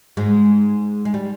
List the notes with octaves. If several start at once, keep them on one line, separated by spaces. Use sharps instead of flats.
G#2 G#3
G#3
G3